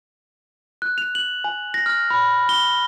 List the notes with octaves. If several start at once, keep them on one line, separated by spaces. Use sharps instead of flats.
F#6
F7
F#7
G#5
A#6
F6
B5
G7